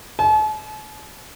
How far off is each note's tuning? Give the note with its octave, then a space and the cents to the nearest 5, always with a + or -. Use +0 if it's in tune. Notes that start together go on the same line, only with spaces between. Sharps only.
A5 -45